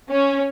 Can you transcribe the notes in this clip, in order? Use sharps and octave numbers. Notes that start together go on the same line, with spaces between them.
C#4